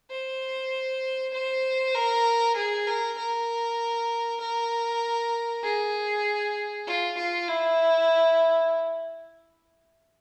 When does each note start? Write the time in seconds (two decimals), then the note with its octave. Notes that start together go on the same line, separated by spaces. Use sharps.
0.11 C5
1.33 C5
1.95 A#4
2.56 G#4
2.87 A#4
3.18 A#4
4.41 A#4
5.63 G#4
6.87 F4
7.17 F4
7.48 E4